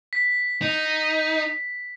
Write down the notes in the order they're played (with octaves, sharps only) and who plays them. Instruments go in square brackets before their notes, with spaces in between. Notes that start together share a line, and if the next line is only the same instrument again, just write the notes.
[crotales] B6
[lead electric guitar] D#4